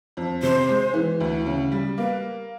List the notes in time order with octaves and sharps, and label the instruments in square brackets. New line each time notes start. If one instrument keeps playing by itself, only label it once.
[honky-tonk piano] F2
[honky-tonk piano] C3 [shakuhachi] C5
[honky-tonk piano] G#3
E3
D2
C#3
G3
[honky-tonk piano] A#3 [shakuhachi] B4